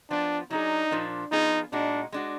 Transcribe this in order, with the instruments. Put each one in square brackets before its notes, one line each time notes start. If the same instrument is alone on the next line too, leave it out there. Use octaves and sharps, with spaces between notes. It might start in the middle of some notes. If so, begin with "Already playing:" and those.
[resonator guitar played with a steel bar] F3 B3 F4 [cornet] D4
[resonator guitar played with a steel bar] F#3 D4 G#4 [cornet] D#4
[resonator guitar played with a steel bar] A#2 F3 A#3 D4
[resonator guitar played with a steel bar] F3 B3 F4 G#4 [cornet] D#4
[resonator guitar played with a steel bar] A#2 G#3 D#4 F#4 [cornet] D4
[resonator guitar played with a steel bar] G#3 D4 F#4